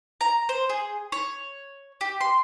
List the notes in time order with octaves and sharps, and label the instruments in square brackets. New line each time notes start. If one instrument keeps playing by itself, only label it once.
[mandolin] A#5
C5
G#4
C#5
G4
C6